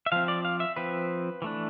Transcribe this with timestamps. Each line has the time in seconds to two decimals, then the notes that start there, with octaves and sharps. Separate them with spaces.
0.06 E5
0.12 F3 C4 F5
0.28 D5
0.45 F5
0.60 E5
0.76 F3 C4 B4
1.42 E3 A3 D4